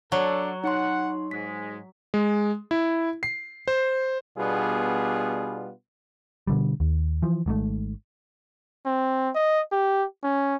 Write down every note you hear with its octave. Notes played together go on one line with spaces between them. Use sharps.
F#3 D4 A4 F#5
D#4 F#5 C6
G#2 G#3 B6
G#3
E4
C7
C5
B2 G3 B3 D4 F4 G#4
B2 D3 G3
D#2
E3 F3
G#1 G#2 D3 A3
C4
D#5
G4
C#4